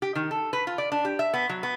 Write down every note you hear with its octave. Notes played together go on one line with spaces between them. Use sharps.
G4
D#3
A4
B4
F4
D5
D4
G4
E5
B3
F#3
B3